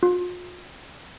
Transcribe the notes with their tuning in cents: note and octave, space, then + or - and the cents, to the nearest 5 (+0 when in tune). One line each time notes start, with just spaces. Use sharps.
F4 +40